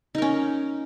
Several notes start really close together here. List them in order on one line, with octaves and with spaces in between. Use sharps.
D#4 A#4 C#4